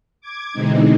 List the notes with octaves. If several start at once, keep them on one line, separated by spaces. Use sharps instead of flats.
D6 G#6
B2 D3 E3 G#3 C4 D#4